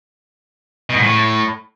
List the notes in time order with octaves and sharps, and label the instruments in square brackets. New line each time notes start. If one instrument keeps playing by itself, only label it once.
[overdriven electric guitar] B2
G#2
A2